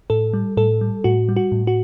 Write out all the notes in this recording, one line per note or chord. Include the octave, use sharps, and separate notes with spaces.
A2 A4
G3
A2 A4
G3
A2 F#4
G3
F#4
A2
F#4